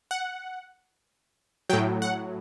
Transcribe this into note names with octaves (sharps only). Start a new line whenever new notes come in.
F#5
A2 F#3 G5
F#5